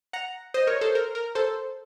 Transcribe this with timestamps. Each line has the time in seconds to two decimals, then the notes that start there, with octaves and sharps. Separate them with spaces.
0.13 F#5 A#5
0.54 C5 D#5
0.67 A#4 C#5
0.81 A4 C5
0.95 A#4
1.15 A#4
1.35 A4 C5